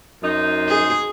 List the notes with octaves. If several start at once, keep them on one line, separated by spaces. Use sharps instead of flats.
F#2 D#4 C5
G#4